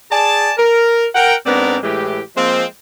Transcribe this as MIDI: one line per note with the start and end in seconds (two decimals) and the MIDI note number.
0.11 0.52 68
0.11 0.52 74
0.11 0.52 80
0.11 0.52 81
0.57 1.07 70
1.14 1.35 70
1.14 1.35 78
1.14 1.35 79
1.46 1.78 44
1.46 1.78 59
1.46 1.78 60
1.46 1.78 62
1.46 1.78 70
1.46 1.78 74
1.83 2.21 45
1.83 2.21 52
1.83 2.21 56
1.83 2.21 67
2.37 2.65 53
2.37 2.65 56
2.37 2.65 58
2.37 2.65 60